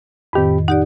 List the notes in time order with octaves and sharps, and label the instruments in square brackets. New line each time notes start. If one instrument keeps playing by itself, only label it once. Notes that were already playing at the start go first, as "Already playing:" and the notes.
[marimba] F2 A2 D#3 [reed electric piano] C4 G4 B5
[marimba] D#4 G4 D5 [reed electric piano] F#5